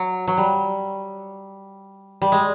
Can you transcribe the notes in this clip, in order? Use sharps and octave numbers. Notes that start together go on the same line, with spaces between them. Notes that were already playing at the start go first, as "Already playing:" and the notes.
Already playing: F#3
F#3
G3
G3
G#3